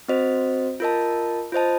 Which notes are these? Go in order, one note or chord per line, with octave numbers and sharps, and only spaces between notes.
C4 F#4 C5 D#5
F4 A#4 D#5 A5
F4 C5 D#5 A5